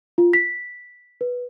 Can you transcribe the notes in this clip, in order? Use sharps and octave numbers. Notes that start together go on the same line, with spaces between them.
F4
B6
B4